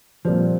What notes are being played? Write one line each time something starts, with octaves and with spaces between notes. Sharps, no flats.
A#2 F3 G3 C4